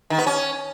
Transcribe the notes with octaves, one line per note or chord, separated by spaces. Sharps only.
D#3
B3
C#4